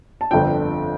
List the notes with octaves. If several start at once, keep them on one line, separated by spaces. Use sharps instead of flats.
A5
G1 F2 D3 F3 G5